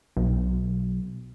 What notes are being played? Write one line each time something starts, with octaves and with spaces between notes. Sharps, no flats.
B1